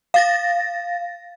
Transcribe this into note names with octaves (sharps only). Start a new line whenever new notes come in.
F5 A6 A#6